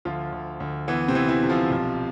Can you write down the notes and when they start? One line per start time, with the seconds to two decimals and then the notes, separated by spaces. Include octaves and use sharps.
0.05 D2 F3 F4
0.32 D2
0.60 D2
0.88 E3 B3
1.08 C3 C4
1.15 E3
1.28 E3 E4
1.43 C3
1.49 F3 F4
1.71 B1